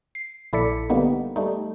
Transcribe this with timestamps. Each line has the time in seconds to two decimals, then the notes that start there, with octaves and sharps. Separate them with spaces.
0.15 C7
0.53 A#1 E4 A4 D5 B6 C#7
0.90 D3 G3 A#3 B3 D#4
1.36 G3 A3 D#4